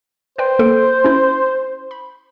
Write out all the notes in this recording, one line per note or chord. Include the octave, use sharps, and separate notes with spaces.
B4 C5 D5 G5
A#3 A4 D7
C#4 E4
B5